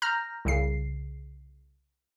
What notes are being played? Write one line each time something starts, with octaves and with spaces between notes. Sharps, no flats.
A#5 F6 G6 A#6
C2 C#3 C7